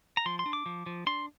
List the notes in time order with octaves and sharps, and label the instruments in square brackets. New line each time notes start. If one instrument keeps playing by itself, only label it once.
[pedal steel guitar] A#5
F3 C6
C6
D4
D6
F3
F3
D4 C6